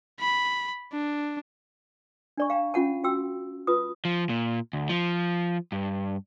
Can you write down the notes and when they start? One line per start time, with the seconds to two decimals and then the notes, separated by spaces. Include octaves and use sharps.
0.20 B5
0.93 D4
2.38 D4 D5 C#6
2.50 F5 G5 A#5
2.74 C#4 F4 F#5 A5
3.04 F#4 G5 E6
3.67 F4 B4 D#6
4.05 F3
4.29 A#2
4.73 D2
4.90 F3
5.72 G2